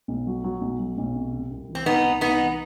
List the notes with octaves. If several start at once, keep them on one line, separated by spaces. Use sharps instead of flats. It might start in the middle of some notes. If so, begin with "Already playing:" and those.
B1
F#3
F#3
B1
F#3
B1
C3
C3
C2
E3
C4
C2 B3 D#4
C2
C2 B3 D#4
E3